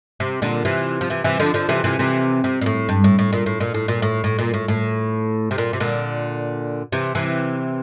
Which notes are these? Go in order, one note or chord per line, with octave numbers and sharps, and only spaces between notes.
C3
A#2 D3
C3 E3
F3
C3 E3
C3 E3
D3 F3
D3 F3
C3 E3
C3 E3
C3 E3
C3
A#2
A2
G2
A2
A2
A#2
A2
A#2
A2
A#2
A2
A2
A#2
A2
A2
C3
A#2
C3
A#2 D3
C3 E3
C3 E3